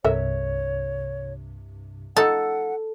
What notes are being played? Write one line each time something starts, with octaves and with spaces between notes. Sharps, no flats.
C2 G2 C3 A4 A#4 C#5 E5
F3 A3 D#4 A4 F#5